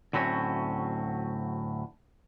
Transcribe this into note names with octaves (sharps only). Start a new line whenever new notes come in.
D2 A2 F#3 C4 C#4